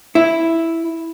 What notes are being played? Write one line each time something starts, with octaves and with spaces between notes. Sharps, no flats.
E4